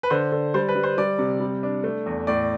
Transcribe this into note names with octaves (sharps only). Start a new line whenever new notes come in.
B4
D3 C5
D3
G3 C5
B4
G3
C5
G3 D5
C3
G3
D4
A3
E2
A2 D5